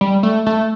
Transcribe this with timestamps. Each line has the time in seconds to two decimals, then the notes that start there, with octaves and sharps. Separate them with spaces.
0.01 G3
0.23 A3
0.47 A3